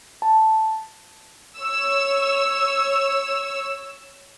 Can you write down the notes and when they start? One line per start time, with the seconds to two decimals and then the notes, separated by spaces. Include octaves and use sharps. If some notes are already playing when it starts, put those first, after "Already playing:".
0.22 A5
1.59 C#5 E6